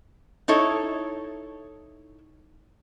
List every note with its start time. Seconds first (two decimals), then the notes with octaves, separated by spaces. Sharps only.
0.48 D#4 E4 A4 C#5